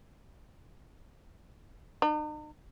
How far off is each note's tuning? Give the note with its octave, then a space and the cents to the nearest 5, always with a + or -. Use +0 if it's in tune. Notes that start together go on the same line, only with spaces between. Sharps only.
D#4 -45